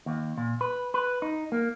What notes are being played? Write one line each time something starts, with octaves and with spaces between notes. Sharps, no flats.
D#2
A#2
B4
B4
D#4
A#3